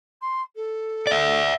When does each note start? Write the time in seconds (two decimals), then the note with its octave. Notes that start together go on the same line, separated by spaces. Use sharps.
0.21 C6
0.55 A4
1.07 D5 E5